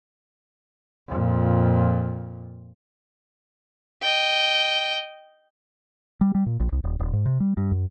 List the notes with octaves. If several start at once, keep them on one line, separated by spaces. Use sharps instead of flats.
F2 A#2
D#5 G5
G3
G3
A#2
A#1
C2
D#1
D#1
G#2
C3
G3
G2
F#2